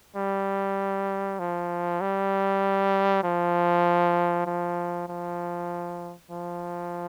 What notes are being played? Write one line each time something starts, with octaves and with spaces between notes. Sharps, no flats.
G3
F3
G3
F3
F3
F3
F3